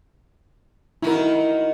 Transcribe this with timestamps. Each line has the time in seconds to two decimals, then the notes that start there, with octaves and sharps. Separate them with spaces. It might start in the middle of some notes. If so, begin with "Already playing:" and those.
1.02 D#3 D#4 E4 F#4 A#4